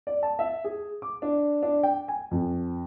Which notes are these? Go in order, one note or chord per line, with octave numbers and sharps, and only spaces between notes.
D5
A5
E5
G#4
D6
D4
D4
G5
G#5
F2